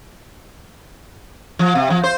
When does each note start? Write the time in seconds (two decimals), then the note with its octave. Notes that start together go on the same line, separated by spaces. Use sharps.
1.59 F3
1.75 C3
1.90 F3
2.04 C5